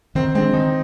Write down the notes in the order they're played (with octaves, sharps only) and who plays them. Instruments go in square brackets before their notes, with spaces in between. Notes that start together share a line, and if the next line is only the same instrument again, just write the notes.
[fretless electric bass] D#3 [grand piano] C4
[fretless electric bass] G#3 [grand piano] C4
[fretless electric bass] D4
[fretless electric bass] D#3 [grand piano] D#4